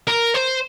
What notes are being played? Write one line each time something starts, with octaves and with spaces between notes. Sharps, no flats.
A#4
C5